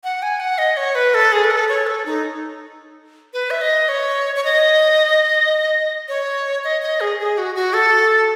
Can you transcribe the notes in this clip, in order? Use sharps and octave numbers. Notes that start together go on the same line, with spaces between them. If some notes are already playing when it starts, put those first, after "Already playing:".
F#5
G#5
F#5
D#5
C#5
B4
A4
G#4
B4
A4
C#5
A4
D#4
B4
E5
D#5
C#5
C#5
D#5
C#5
D#5
D#5
G#4
G#4
F#4
F#4
A4